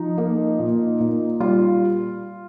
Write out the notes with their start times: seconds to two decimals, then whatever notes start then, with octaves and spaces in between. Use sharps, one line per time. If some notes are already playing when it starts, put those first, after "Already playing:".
Already playing: F3 D#4
0.18 A#3
0.59 A#2
1.00 A#2
1.40 G3 F4